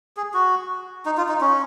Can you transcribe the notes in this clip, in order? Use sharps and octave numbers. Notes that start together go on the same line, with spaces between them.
G#4
F#4
D#4
F4
D#4
C#4